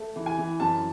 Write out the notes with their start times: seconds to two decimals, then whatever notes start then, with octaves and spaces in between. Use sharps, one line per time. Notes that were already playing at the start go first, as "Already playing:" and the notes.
Already playing: A3
0.16 E3
0.26 G#5
0.38 E3
0.60 F#2 A5